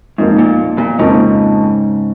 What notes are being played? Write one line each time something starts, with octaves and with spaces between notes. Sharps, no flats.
F2 G#2 F3 A#3 D#4
A#2
A#2
F2 G#2 C#3 F3 A#3 D#4